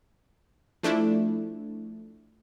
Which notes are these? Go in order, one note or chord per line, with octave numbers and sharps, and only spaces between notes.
F3 A3 D4 E4